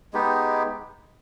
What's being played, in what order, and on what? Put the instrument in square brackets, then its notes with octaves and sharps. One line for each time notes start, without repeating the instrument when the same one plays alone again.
[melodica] G#3 B3 D#4 G4